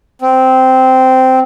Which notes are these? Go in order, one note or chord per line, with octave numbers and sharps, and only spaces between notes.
C4